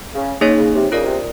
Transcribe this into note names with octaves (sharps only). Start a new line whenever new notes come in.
C#3
C#3 A#3 D#4 G#4 C#5
C#3
C3
C#3 F4 A#4 D5
C3